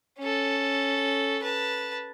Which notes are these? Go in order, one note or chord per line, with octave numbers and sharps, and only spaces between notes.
C#4 A4
B4 A5